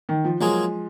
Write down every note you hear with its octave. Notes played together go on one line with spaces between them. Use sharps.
D#3
F3
F3 F#3 G#3 A#3 F4 G#4